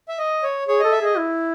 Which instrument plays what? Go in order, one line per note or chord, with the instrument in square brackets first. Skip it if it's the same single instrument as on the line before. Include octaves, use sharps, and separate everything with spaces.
[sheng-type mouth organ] E5
D#5
C#5
[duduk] G#4 [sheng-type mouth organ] C#5
[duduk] A4 [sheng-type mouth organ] D#5
[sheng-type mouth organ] E5
[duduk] G#4 [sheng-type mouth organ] D#5
[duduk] E4